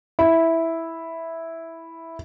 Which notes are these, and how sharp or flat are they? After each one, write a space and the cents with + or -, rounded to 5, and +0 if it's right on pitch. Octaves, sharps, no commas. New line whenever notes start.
E4 -5